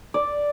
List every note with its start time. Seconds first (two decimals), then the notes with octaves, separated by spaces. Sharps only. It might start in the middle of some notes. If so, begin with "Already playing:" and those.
0.14 D5